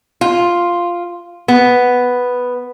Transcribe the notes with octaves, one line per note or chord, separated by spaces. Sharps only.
F4
B3